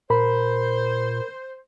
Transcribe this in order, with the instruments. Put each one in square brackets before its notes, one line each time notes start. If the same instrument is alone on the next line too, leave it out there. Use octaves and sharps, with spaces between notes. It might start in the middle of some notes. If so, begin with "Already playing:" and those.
[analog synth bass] A#2 [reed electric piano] A#4 B5 [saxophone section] C5